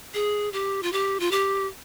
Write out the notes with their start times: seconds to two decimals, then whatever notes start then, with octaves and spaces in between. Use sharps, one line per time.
0.14 G#4
0.53 G4
0.83 F4
0.93 G4
1.20 F4
1.31 G4